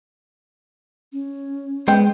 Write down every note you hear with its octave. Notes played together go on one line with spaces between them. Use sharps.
C#4
G#3 B3 C5 G5